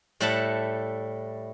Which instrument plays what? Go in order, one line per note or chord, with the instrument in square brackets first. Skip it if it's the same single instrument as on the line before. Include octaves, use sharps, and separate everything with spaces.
[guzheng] A2 G3 A3 E5 F#5 A5